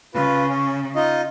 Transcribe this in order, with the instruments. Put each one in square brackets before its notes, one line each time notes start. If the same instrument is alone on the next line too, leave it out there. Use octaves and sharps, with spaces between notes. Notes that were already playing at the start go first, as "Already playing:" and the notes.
[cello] C#3 [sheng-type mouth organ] F4 B4
[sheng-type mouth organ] C#4
D#4 F4 D#5